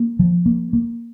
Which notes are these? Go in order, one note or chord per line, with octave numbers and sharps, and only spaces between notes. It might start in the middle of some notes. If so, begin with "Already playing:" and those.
Already playing: A#3
F3
A#3
A#3